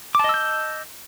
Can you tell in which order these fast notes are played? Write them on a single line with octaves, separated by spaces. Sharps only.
D6 A5 D#5 E6 G6